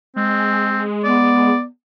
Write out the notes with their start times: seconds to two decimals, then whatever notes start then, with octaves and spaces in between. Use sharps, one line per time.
0.16 G#3 C4
1.04 B3 D5